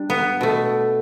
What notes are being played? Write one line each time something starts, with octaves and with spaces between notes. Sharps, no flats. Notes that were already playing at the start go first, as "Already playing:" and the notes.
Already playing: G3 D4
B3
B2 A3